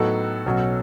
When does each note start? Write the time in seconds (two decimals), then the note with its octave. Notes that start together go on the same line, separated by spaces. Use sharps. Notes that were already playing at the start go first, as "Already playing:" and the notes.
Already playing: A2 F#3 B3 D#4 F#4 A4
0.46 B1 B2 F#3 C#4